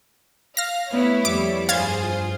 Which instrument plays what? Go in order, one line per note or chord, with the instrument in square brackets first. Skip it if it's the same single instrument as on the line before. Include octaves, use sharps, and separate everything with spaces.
[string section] F5 [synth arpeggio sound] F6 A#6
[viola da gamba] A3 B3 [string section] E4 C#5
[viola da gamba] F2 G3 [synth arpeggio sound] D6
[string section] G2 G#4 C5 [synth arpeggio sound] F5 G#6 A6
[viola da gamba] F4